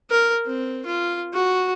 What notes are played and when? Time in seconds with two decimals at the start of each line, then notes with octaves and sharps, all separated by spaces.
0.11 A#4
0.47 C4
0.86 F4
1.34 F#4